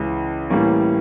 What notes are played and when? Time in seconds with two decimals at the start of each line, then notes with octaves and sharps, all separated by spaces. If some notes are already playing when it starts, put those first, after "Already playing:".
Already playing: C#2 C#3 E3
0.50 A2 E3 G3 A#3 C#4